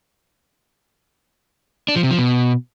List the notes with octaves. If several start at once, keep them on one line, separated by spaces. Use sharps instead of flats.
D4
F3
C3
F3
B2